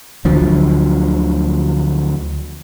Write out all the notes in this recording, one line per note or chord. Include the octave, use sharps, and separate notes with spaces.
D2 D3 F3 F#3